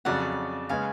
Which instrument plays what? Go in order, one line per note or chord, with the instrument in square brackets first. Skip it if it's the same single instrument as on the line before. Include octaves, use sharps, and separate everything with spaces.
[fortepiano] F2 C#3 F#3 [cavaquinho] D5 F#5
[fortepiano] C#3 G#3 B3 [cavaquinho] F5 G#5